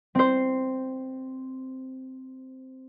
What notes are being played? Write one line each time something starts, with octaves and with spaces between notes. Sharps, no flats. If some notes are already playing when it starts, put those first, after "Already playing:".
C4 C5